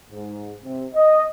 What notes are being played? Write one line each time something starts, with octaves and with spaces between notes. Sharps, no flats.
G#2
C3
D#5